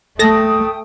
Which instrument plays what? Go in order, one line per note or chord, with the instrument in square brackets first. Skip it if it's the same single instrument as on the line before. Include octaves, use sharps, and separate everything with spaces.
[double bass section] A3 [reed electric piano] A4 [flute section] G5 D#6 [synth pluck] A5 A#6